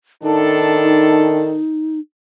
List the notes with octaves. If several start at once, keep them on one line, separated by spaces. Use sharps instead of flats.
A2 D#3 D4 D#4 A4